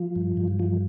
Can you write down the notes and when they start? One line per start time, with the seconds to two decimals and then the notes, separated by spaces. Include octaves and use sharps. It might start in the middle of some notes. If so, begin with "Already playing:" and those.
Already playing: F3
0.16 G2
0.37 G2
0.59 F3